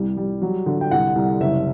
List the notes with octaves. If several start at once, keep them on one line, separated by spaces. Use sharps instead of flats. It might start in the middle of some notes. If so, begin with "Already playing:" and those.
Already playing: C2 G3
G3
F#3
D3
G5
C2 F#5
C2
F#1 E5